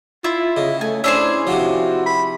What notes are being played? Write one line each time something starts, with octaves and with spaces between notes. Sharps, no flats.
E4 F4
C#3 D#5
A3 G#5
C#4 D4 E4 G#4 C5 C#5
C3 F3 F#4
B5